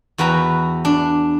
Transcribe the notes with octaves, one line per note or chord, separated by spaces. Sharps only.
E2 F#4 B4 G5 A#5
D4